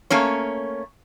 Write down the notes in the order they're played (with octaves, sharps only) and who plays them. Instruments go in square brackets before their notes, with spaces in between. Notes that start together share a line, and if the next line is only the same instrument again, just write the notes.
[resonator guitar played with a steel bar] A3 A#3 C#4 C#5